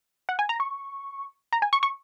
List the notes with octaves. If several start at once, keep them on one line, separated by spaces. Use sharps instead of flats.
F#5
G#5
A#5
C#6
A#5
G#5
C#6
C#6